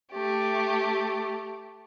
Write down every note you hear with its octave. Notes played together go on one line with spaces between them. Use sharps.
A3 G4